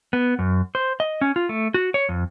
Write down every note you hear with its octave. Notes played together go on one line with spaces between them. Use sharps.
B3
F#2
C5
D#5
C#4
F4
A3
F#4
C#5
F2